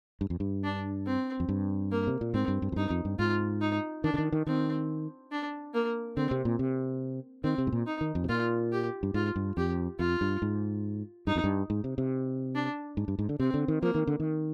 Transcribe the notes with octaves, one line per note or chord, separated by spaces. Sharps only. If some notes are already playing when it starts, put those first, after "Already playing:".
G2
F2
G2
D4
C4
F2
G2
A#3
C3
A#2
G#2 C4
G2
G2
F2
G2 D#4
F2
G2
G#2 F4
D#4
D#3 D4
D3
D#3
D#3
D#3 C4
D4
A#3
D3 C4
C3
A#2
C3
D#3 C4
C3
G#2
A#2
D#4
D#3
F2
C3
A#2 F4
G4
G2
G#2 F4
G2
F2 G4
F2 F4
G2
G#2
G2 D#4
F2
G2
G#2
C3
C3
D4
G#2
G2
G#2
D3
C3 C4
D3
D#3
F3 A#3
D#3
D3
D#3